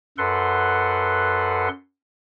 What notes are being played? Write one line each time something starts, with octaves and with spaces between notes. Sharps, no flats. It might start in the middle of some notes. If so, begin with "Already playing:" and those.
F#2 A4 B4 F#5 C6